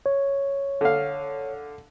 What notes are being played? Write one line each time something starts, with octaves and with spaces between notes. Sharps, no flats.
C#5
D3 F5